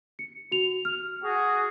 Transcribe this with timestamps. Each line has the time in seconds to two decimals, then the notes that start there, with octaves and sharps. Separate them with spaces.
0.19 C#7
0.52 F#4 F7
0.85 F6
1.22 F#4 G#4